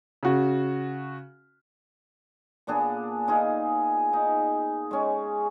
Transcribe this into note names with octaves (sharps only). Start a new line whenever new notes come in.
C#3 F#4
A#2 B3 D4 G#4
D#4 F4 G#4
D#4
G#3 C#4